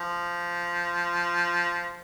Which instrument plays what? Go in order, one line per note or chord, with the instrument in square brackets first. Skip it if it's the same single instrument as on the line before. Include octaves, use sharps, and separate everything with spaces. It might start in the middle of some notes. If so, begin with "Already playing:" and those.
Already playing: [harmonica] F3